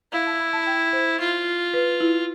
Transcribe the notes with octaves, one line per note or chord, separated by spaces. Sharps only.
E4 F5
A5
B5
A5
G5
C5
F4
B4
E4